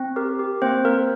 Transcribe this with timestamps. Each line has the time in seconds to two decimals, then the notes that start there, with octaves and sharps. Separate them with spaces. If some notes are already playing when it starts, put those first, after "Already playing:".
Already playing: C4
0.16 G4 A#4
0.39 G4
0.62 A#3 C4 C5
0.85 A#3 A#4